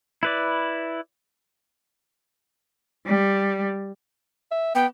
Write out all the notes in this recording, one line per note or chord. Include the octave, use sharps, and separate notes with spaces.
E4 B4 D5
G3
E5
B3 G5